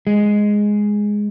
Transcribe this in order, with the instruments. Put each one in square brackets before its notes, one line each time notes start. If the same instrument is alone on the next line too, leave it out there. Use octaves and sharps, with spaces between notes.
[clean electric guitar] G#3